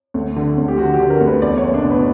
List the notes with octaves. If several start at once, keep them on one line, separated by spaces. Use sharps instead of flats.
D2
D3
D2
G4
D3 F#4
G4
D3
A#4
D2
B4
E2 D5
C#5
F#1
D4
B2
B4